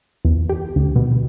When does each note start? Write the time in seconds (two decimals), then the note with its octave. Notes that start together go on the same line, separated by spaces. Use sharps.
0.25 E2
0.49 G4
0.76 D2
0.96 B2